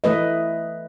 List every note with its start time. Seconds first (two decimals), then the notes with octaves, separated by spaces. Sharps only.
0.04 E3 A3 B4 D#5